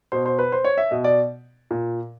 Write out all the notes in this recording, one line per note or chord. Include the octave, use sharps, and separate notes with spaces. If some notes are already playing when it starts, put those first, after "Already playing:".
B2 C5
C5
B4
C5
C#5
E5
B2 D#5
D5
A#2